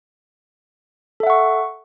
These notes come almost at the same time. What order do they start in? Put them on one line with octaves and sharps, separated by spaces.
A4 E5 F#5 C#6